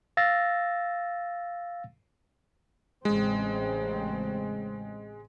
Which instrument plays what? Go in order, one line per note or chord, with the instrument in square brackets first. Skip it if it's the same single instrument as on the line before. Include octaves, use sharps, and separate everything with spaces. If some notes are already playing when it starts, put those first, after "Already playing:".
[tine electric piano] F5 E6 A6 A#6
[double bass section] A1 C#3 C4 [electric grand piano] G#3